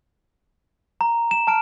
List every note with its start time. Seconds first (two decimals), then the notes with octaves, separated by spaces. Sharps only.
1.01 A#5
1.31 E7
1.47 A5 F6 D7 E7